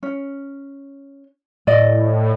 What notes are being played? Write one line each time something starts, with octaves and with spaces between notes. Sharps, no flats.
C#4
A2 D5 D#5